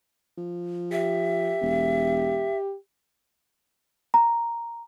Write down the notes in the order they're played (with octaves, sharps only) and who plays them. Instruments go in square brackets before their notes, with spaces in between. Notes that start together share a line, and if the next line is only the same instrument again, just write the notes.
[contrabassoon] F3
[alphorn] G4 [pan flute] E5
[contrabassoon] E1
[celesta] A#5